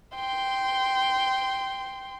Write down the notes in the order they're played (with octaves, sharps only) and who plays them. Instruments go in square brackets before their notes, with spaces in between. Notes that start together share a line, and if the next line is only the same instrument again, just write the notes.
[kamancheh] G5 C6